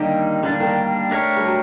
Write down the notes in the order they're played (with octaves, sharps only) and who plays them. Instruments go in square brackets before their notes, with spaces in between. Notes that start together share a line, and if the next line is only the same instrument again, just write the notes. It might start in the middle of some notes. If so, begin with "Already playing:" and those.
Already playing: [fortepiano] D3 [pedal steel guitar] D#3 G3 A#3 D#4 G4
[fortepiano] D3 [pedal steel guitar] G3 A#3 D4
[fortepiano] D#3
[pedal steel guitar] A3 D4 G4 A#4 C#5
[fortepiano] G3
F#3